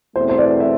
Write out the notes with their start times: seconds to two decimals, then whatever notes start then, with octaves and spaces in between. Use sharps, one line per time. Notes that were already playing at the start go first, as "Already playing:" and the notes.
0.15 E2 B2 A3 C4 E4 C5
0.29 C5
0.38 D5
0.60 E5